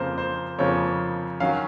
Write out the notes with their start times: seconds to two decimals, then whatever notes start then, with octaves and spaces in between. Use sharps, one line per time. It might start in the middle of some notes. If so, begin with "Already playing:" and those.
Already playing: F2 C#3 F3 A#3 C5
0.18 C5
0.59 F2 C#3 F3 A#3 C#5
1.40 D#3 F#3 C#4 F5